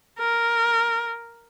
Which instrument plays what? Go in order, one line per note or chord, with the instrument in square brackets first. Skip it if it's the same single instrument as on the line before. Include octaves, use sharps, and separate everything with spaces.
[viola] A#4